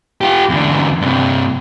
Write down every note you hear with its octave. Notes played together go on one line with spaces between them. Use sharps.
F4 G4
E2 D3
G2 C3